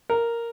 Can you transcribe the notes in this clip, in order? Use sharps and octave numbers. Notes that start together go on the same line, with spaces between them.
A#4